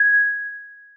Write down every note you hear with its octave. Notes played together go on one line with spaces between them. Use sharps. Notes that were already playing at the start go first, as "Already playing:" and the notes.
Already playing: G#6